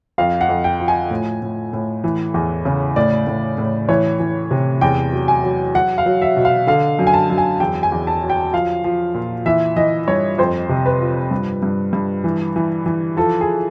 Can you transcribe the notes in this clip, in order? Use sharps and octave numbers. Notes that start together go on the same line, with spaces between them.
F2 F5
F#5
F2
G5
F3
G#5
A2
A2
A2
E3
E2
C#3
A2 D5
A2
A2
E3 C#5
E3
C3
E2 G5
F#3
G#5
F#3
F#3 F#5
F5
F#3
E5
B2
F5
D3 F5
F#2
G#5
A5
F#2
G#5
E2 G5
G#5
E2
A5
F#3
G5
F3 F5
F3
A#2
E3 E5
E3 D#5
G2 C#5
F2 C5
C3
B4
F3
G2
G2
G2
E3
E3
E3
F3 A4
G#4